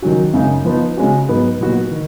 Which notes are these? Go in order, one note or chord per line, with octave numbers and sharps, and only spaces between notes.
D#3 F#3 C#4 F#4
F#2 C#3 G#3 D#4
F3 B3 D#4
C#3 G#3 C#4 F#4
G#2 F#3 B3 D#4
A#2 F#3 B3 D#4 F#4
D#3